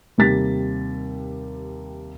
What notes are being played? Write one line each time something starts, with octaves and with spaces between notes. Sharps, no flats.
D#2 C3 G3 A6 B6